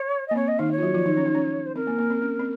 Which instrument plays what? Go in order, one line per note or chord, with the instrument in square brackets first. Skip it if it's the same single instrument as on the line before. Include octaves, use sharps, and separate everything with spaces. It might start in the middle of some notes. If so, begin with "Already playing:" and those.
Already playing: [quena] C#5
D#5
[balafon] A#3
[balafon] C4 [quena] C#5
[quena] D#5
[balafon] D#3 D#4 [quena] F5
[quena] C#5
[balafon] F4
F#3 F#4
F3 F4
D#3 D#4
C#4
D#4
C#4
[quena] C5
[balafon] C4 [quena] A#4
[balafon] A#3
A#3
C4
C#4
C4